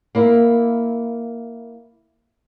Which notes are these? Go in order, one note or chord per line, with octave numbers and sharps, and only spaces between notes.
A#3 E4